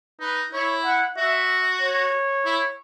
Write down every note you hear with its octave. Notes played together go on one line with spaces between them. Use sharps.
D#4 B4
E4 C#5
F#5
F#4 E5
C#5
E4